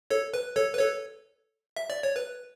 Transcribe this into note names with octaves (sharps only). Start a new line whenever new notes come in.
A4 C#5
B4
A4 C#5
B4
A4 C#5
E5
D5
C#5
B4